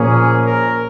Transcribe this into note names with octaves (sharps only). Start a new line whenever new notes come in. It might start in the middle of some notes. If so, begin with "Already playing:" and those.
Already playing: A#2 F3 A#3 C#4 G#4
A#4